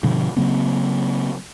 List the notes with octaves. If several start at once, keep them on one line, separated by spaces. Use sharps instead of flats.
G2 B2 D3 F3
C#3 F#3 A#3 C4